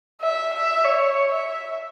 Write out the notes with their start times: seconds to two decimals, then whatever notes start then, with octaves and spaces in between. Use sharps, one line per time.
0.21 E5
0.53 E5
0.84 C#5
1.32 E5